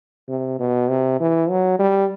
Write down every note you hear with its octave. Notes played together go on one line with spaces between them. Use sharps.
C3
B2
C3
E3
F#3
G3